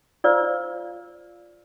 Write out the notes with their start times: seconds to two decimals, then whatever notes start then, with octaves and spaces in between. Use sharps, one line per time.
0.24 F4 C5 D5 F5 E6